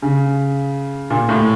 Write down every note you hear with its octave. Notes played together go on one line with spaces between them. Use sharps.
C#3
A#2
A2